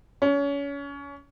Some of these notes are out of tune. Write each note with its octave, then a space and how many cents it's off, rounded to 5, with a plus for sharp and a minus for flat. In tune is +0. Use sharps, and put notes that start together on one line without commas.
C#4 +30